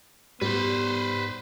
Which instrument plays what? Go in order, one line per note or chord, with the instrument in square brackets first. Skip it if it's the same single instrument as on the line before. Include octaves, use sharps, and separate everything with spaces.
[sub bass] G#2 [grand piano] G3 [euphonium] B3 [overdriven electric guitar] B4 C5